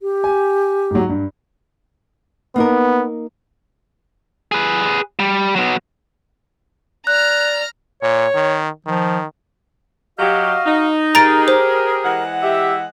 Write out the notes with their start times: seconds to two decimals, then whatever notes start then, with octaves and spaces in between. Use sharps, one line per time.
0.01 G4
0.24 G#5
0.91 G#2 F#3
1.09 G2
2.56 A#3 B3 D#4 A#4
4.52 G#4 B4
5.19 G3
5.56 F#3 B3
7.07 D5 A#5 F6 F#6
8.02 A#2 C#5
8.35 D#3
8.87 D#3 F3
10.19 F#3 F#4 G4 D#5 F5
10.67 D#4
11.15 G4 G#4 A#4 A#5 A6 D7
11.48 C5
12.04 E3 G#3 F#5
12.42 G4 E5